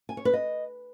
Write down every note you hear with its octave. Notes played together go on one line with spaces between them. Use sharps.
G#5
C#5
B4
D#5